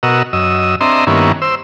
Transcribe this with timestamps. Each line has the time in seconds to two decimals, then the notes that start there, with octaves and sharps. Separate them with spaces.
0.03 B2 F#4 A#4 D#5 E6
0.33 F#2 D#5 E6
0.81 C4 D4 D#5 E5 A#5 C6
1.07 G2 D#3 A#3 B3 C#4 E4
1.42 C5 E6